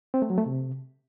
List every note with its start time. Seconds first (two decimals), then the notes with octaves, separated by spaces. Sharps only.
0.14 C4
0.22 A3
0.30 F#3
0.38 A3
0.46 C3